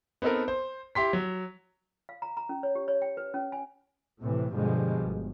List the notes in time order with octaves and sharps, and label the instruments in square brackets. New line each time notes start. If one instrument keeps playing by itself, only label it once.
[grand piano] B3 C4 D#4 A4 A#4
C5
E4 G4 C6 B6
F#3
[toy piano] F5
A#5
A#5
C#4
C#5
G4
C#5
G5
B4
C#4
G#5
[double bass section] A2 C3 E3
G2 B2 D3 F3 G3 G#3
G1